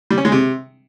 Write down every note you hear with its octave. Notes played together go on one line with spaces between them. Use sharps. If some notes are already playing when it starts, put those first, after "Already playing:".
G3
C#4
G#3
C3